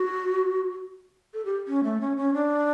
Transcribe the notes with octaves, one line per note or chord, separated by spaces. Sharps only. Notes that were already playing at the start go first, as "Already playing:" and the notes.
Already playing: F#4
A4
G4
C#4
A3
C#4
C#4
D4